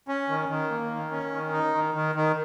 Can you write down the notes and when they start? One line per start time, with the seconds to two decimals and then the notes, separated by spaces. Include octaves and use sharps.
0.08 C#4
0.29 D#3
0.49 D#3
0.70 A#3
0.91 D#3
1.11 C#4
1.32 D#3
1.52 D#4
1.74 D#3
1.94 D#3
2.15 D#3